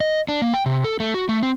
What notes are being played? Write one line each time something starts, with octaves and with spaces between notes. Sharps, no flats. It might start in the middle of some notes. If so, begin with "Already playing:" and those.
D#5
D4
A#3
G5
C3
A4
A3
F#4
A3
C4